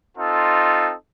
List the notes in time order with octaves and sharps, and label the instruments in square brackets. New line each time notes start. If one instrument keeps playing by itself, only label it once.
[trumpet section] C4 D#4 F4 A4